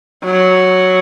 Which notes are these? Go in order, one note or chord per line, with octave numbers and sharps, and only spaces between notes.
F#3